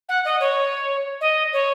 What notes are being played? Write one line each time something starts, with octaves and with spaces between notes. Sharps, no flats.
F#5
D#5
C#5
D#5
C#5